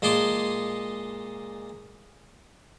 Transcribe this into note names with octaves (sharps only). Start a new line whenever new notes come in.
A#2 G#3 G#4 A5 C6 D6